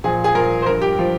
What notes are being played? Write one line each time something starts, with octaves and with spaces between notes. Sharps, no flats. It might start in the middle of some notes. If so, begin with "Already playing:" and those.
A#2 F3 G#4
G#4
A#2 F3 A#4
C5
G2 F3 A#4
G4
F3